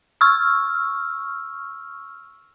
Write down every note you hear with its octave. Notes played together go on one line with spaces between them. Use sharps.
C#6 E6 F6